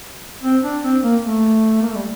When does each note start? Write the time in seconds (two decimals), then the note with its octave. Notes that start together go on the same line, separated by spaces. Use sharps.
0.43 C4
0.63 D4
0.83 C4
1.02 A#3
1.23 A3
1.82 A#3
1.88 A3
1.96 G3